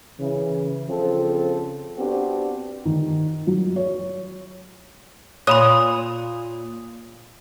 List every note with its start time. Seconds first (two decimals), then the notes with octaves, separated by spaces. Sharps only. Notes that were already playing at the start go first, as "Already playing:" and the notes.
0.20 C#3 E3
0.89 C#3 F3 C4 A4
1.98 B3 C4 D4 F#4 G4
2.85 D#3
3.47 F#3
3.76 C#5
5.47 A#2 C#5 B5 C6 D#6